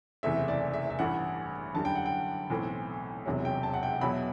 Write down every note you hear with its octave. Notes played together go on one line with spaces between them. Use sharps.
F#1 E2 C3 E3 A3 E5
D5
E5
E5
A1 G2 E3 A3 F#5
F#2 D3 G3 A5
G5
F#5
G5
B1 A2 E3 A3 C4
E1 E2 C3 F#3
G5
A5
F#5
G5
E2 B2 F#3 B3 E4 B5